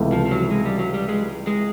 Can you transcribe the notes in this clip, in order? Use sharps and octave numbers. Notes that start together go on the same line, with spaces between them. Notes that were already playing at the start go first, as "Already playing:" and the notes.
Already playing: C#2 C3 E3 A3
F3
F3
F#3
G#3
G3
F#3
G3
G#3
G#3